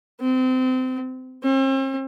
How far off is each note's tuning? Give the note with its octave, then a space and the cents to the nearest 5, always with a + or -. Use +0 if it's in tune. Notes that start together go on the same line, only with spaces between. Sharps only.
C4 -25
C4 +45